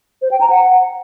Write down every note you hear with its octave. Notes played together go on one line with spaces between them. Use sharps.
C5
G5
A#5
F#5